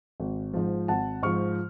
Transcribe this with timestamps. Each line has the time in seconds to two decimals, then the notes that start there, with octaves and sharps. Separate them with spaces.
0.20 G#1
0.54 G#2 F3
0.88 G#1 F#5 A5
1.22 G#2 F3 C#6 F6